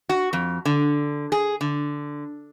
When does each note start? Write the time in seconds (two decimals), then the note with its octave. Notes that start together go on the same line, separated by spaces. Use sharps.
0.09 F#4
0.33 F2
0.65 D3
1.32 G#4
1.61 D3